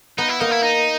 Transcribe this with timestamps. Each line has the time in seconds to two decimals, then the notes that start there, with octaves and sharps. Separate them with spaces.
0.18 B3 D#4
0.29 E4
0.40 A#3 D#4
0.51 E4
0.63 D#4